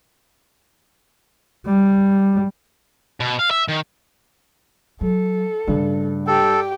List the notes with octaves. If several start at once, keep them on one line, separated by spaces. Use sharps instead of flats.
G3
B2
F5
E5
D#3
F#3 A4
G2 C#3 A3
G4 A4 G5